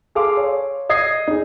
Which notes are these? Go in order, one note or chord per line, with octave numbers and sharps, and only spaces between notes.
G#4 A4 F5 C6 D6
C#5
D#5 D#6 G#6 C7
D#4 G#4